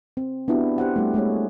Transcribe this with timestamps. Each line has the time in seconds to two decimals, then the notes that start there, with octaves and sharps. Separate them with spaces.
0.17 C4
0.48 B3 D4 E4 F#4 G4
0.78 G4 C5 F#5
0.96 G3 A3
1.14 G#3 A3 G#4 C#5